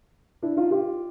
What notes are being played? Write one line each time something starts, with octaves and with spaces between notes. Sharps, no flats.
D4 E4
D#4 F4
F4 G4